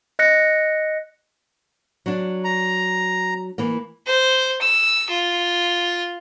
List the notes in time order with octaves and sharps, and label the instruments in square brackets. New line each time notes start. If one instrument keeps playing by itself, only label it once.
[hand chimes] D#5 F#6 A#6 C#7
[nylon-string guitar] F#3 D4
[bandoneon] A#5
[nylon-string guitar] E3 A#3
[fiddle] C5
E6
F4